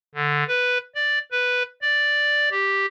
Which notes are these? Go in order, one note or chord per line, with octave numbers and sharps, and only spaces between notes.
D3
B4
D5
B4
D5
G4